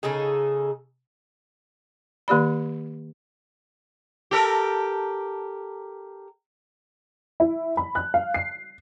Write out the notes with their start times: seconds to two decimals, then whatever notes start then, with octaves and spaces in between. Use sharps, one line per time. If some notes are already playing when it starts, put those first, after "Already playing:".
0.03 C#3 D#4 G#4 A4
2.28 D#3 A#3 G4 D5 B5
4.31 G4 A4 A#4
7.40 E4
7.77 B5
7.95 F#6
8.14 F5
8.34 C7